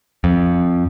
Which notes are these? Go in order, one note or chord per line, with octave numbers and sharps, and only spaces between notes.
F2